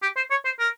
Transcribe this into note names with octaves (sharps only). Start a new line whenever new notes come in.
G4
C5
C#5
C5
A#4